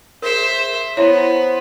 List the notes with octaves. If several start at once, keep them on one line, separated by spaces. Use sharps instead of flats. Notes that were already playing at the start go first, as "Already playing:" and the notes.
G#4 A#4 C5 E5
B3 E4 C5 C#5 E5 A#5